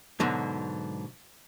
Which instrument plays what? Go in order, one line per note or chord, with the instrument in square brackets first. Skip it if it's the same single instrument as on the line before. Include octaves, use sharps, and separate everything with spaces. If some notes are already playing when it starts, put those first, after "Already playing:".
[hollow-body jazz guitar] G#2 B2 D3 F#3